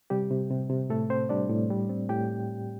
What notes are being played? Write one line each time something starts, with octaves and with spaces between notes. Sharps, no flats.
C3 G3 G4
C3
C3
C3
A2 A3 A4
C4 C5
G3 D4 D5
A2
G3
C4
A2 G4 G5